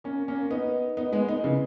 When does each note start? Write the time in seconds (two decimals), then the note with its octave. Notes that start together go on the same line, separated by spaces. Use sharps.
0.04 A#3 C#4
0.28 A#3 C#4
0.51 B3 D#4
0.97 B3 D#4
1.13 G#3 B3
1.28 B3 D#4
1.44 C#3 E3